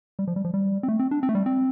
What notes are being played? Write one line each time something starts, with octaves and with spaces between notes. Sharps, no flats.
G3
F3
G3
F3
G3
C4
A3
C4
D4
C4
A3
G3
C4